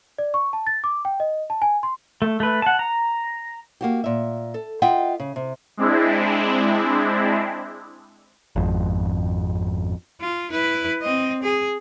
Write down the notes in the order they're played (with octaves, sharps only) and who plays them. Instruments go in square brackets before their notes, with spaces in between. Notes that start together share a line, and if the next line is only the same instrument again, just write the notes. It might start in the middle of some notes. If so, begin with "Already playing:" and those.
[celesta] D5
C#6
A5
A6
D6
G5
D#5
A5
G#5
C6
[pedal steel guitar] A3
A3 B4
F#5 A5
A#5
[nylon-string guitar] A#3 F#4 G4
A#2 E5
A4
F4 D#5 E5 F#5 G5
C#3
C3
[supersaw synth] G#3 C4 D4 E4
[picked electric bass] G#1 F2
[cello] F4
E4 B4
C4 D#5
G#4